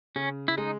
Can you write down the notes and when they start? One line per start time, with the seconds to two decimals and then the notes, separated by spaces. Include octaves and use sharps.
0.16 C#3 C#4
0.48 E4
0.57 G#3 D#4